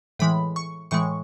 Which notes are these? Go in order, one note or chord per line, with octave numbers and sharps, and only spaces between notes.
A2 E3 G#3 B5
C#6
A2 E3 G#3 C#6